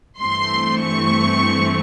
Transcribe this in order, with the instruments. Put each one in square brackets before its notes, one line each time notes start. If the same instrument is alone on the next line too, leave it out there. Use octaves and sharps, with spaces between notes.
[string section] G2 E3 A3 C4 C6
C#6